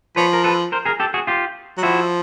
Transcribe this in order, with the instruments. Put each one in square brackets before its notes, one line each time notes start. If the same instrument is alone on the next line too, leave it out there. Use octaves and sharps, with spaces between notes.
[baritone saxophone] F3 [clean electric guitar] B4 C#5
[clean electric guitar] A#4
A4 B4
A#4 C5
G#4 A#4
G4 A4
F#4 G#4
F4 G4
[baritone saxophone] F#3
[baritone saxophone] F3 [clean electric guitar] E4 F#4